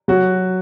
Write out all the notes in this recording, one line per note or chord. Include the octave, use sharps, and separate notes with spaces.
F#3 F#4